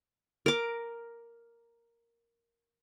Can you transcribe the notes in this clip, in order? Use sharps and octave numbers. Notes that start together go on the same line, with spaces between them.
A#4 D6